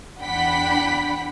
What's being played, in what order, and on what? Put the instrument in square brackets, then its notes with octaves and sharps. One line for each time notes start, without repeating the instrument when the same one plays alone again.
[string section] E2 D4 F#5 G5 B5 B6